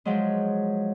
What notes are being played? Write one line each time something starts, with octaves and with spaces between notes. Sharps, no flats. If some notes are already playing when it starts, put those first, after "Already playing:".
F3 F#3 G#3